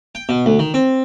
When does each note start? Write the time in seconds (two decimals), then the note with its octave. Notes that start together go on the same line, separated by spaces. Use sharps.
0.15 G5
0.29 B2
0.46 D2
0.59 D#3
0.74 C4